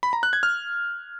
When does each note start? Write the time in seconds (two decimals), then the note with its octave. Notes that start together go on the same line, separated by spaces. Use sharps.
0.03 B5
0.13 A#5
0.23 F#6
0.33 G#6
0.43 F6